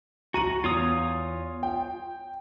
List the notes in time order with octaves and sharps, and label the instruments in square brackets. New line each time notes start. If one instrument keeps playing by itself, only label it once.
[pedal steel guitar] F#4 [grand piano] A#5 D#7 F#7
[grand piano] E2 [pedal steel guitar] F4 C#5 D#6
[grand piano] G5